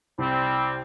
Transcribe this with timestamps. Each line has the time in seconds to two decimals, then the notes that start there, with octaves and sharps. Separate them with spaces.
0.18 C2 G3 C4